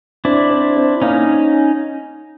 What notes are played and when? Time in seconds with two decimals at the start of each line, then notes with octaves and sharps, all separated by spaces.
0.25 C4 D4 E4
0.50 C4
0.77 C4
1.02 A#3 C#4 D#4